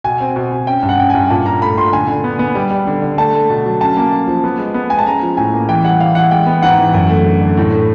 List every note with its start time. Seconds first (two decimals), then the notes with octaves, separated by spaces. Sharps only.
0.04 B2 G#5
0.20 C4
0.36 B2
0.51 B2
0.67 C#4 G5
0.83 G2
0.89 F#5
0.98 C#4 G5
1.10 G#5
1.15 G2
1.30 A#2 A5
1.46 A#2 A#5
1.62 A3 B5
1.77 A#2 C6
1.92 D3 G#5
2.08 D3
2.24 B3
2.39 B3
2.55 G3
2.70 G3
2.87 D3
3.02 D3
3.18 A3 A5
3.33 A3
3.50 B2
3.66 F#3
3.80 C#4 A5
3.97 A#3
4.12 A#3
4.28 F3
4.44 B3
4.58 G#3
4.74 B3
4.90 G#3 G#5
4.99 A5
5.06 C#4 A#5
5.22 F3
5.37 A2 G#5
5.54 A#3
5.68 E3 G5
5.84 G3 F#5
6.00 E3 F5
6.15 E3 F#5
6.31 G#3 G5
6.46 B3
6.62 G#2 F#5
6.78 E3
6.94 F#2
7.09 A3
7.26 D3
7.41 D3
7.57 A2
7.72 A3